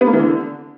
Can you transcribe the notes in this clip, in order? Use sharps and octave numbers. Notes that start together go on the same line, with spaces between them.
B3
A#3
E3
D3